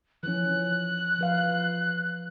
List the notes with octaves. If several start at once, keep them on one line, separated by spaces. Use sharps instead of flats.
E3 F3 C#4 F#6
F3 B4 F5